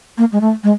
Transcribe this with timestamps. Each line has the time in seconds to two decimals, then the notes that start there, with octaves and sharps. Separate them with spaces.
0.18 A#3
0.32 G#3
0.41 A3
0.63 G#3